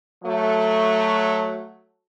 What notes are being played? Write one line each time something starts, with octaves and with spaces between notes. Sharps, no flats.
F#3 A3